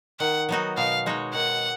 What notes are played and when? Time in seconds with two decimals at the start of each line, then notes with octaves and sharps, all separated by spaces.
0.20 D#3 F#5
0.49 F#3 B3 D#4 F#4
0.77 B2 F5
1.06 G#3 D#4 F#4 C#5
1.34 D#3 F#5